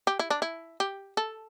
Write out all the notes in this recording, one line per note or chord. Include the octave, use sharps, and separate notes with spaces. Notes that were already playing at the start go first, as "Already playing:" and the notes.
G4
E4
D4
E4
G4
A4